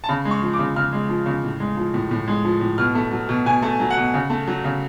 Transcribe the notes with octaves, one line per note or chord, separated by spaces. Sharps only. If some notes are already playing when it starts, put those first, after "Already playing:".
A5
C#3 B5
G#3
C#6
F3
D6
C#3
C#3 F6
G#3
F3
C#3
A2
G#3
F3
A2
A2
G#3
F3
A2
B2 F6
A3
F#3
B2
B2 G#5
A3
F#3
F#5
B2
C#3
A3
F#3
C#3